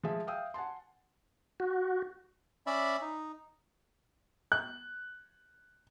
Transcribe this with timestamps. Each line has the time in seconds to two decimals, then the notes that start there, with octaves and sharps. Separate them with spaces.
0.03 F3 G#3 G#4 E5
0.27 E5 F5 G5 D#6 E6
0.54 F#5 G#5 A5 C6
1.60 F#4
2.66 C#4 D5 E5 B5
3.01 D#4
4.52 F#6